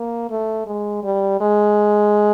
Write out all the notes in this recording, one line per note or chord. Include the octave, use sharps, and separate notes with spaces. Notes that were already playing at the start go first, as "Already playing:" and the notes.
Already playing: A#3
A3
G#3
G3
G#3